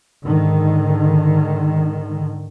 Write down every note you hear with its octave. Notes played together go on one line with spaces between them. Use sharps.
G#2 D3 D#3